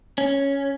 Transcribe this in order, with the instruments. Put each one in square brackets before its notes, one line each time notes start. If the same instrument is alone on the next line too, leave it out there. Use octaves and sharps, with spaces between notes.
[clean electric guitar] C#4